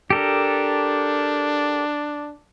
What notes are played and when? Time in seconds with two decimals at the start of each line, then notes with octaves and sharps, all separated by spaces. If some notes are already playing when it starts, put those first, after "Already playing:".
0.10 D4 G4 A4 A#4